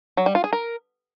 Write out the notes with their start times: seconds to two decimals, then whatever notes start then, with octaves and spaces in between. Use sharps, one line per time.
0.17 F#3
0.26 G3
0.35 F4
0.44 G#4
0.53 A#4